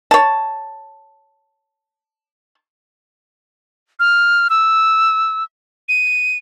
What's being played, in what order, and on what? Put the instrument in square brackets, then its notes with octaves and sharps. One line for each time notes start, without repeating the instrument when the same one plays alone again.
[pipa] C#5 A5
[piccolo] F6
E6
D#7